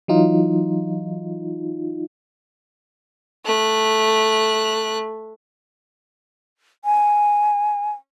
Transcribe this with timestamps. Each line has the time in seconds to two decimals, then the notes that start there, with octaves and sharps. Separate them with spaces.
0.08 E3 F#3 D#4 F4
3.45 A3 F#6
6.85 G#5